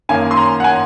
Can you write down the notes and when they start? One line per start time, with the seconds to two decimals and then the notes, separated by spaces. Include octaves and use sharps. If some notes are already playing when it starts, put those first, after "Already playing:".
0.09 F#2 D#3 A#3 G#5
0.31 C6
0.37 A#5
0.60 F#5
0.64 G#5